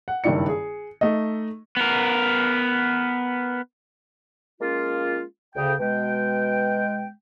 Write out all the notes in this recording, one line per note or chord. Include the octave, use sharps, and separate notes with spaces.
F#5
F#1 G2 D#3 E4 D5 C#7
G#4
A3 D#4 D#5
B3 A#4
G#3 A#3 C#4 F4
D2 C#3 G5
B2 G#3 G5